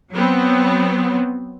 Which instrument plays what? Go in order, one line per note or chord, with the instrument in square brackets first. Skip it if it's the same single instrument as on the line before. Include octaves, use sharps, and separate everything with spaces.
[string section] F#3 B3 C4